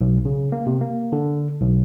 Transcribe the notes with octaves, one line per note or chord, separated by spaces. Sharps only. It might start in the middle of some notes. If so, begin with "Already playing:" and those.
B1
C#3
A#3
C3
A#3
D3
B1